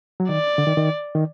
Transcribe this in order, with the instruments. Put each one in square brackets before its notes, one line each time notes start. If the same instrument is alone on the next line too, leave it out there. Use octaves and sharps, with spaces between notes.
[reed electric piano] F#3
[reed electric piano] D#3 [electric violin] D5
[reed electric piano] D3
D#3
D#3
D#3